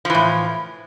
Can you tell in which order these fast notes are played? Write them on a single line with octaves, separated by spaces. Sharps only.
F3 E3 A2